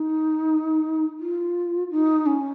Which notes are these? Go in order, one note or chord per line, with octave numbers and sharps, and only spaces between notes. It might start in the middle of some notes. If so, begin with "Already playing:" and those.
Already playing: D#4
F4
D#4
C#4